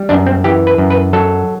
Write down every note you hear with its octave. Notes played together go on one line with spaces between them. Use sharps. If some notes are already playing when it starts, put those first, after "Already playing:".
Already playing: G3
F#2 D4
C4
E3 G4
B4
F#2
B4
F#3 A4